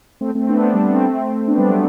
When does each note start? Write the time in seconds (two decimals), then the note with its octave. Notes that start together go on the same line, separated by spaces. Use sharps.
0.21 A3 C4
0.35 A3 C4
0.49 B3 D4
0.63 B3 D4
0.74 G3 B3
0.84 G3 B3
0.95 A3 C4
1.48 B3 D4
1.58 G3 B3
1.69 F#3 A3